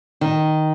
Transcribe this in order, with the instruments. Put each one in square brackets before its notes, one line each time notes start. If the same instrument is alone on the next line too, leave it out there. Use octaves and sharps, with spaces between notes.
[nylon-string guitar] D#3